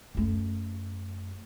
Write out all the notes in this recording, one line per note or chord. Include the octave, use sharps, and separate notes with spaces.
F#2 A3